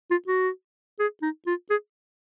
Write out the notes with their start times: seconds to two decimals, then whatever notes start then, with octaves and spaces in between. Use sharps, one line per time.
0.11 F4
0.28 F#4
0.99 G#4
1.22 D#4
1.47 F4
1.70 G#4